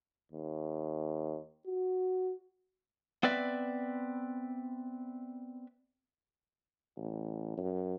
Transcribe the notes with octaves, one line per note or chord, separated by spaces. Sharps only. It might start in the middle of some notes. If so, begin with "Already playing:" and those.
D#2
F#4
B3 C4 B4 D5 E5
A1
F#2